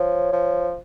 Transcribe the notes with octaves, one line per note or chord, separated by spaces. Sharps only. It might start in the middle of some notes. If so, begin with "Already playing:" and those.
Already playing: F3 C#5
F3